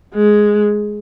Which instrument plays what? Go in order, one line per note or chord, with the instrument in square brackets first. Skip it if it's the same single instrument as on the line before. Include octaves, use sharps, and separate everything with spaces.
[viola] G#3